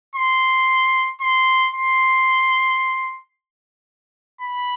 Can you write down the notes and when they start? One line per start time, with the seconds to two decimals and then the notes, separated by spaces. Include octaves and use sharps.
0.16 C6
1.21 C6
1.75 C6
4.41 B5